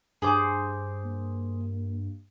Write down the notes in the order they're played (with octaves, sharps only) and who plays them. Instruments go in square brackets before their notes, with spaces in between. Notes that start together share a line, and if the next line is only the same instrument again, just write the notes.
[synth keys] G2 [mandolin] G#4 C5 D6
[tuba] A#3